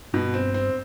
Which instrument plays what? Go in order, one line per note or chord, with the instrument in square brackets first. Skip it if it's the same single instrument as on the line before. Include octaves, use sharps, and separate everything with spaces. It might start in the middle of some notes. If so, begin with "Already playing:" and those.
[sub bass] G2 [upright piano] B2
[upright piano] C4
C4